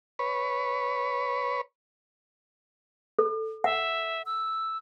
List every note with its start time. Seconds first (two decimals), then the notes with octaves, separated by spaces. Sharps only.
0.19 B4 C#5
3.19 A4
3.64 E5 F#5
4.26 E6